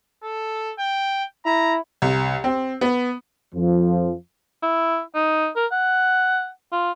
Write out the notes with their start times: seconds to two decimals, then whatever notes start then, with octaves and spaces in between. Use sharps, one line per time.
0.23 A4
0.79 G5
1.45 E4 A#5
2.02 C2
2.44 C4
2.81 B3
3.54 F2 F3
4.62 E4
5.15 D#4
5.56 A#4
5.72 F#5
6.72 F4